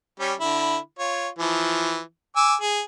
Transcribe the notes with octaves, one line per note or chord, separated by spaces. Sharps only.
G3 C#4 G4
D3 E4 B5
F4 C#5
E3 F3
G#5 D6 E6
G#4